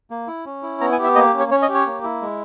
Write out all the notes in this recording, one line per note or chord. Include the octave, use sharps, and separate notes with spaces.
A#3
E4
C#4
E4
B3 A#5
G#5
G4 E5
A#3 D#5
C#4
C#5
C#4 C#5
D#5
G4
C#5
A#3
E4
G#3